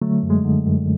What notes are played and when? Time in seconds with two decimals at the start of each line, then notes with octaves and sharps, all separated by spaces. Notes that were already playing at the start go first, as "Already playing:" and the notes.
0.02 D3 F#3 A3
0.23 F#2
0.30 G#3
0.44 D3
0.66 F#2